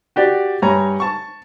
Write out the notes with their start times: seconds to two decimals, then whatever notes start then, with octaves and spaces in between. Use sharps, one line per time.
0.16 F#4 G4 D5
0.62 G2 C#5 G#5 A#5
1.00 A5 C#6